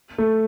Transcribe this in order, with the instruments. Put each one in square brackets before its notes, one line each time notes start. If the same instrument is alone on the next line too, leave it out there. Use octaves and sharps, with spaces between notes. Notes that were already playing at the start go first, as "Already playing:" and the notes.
[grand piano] A3